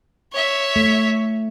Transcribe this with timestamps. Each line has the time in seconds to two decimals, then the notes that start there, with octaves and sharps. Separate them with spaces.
0.33 C#5 E5
0.76 A3